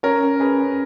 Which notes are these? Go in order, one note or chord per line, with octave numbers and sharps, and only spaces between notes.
C#4 A#4 C#5
C#4
C#4 G#4 B4
C#4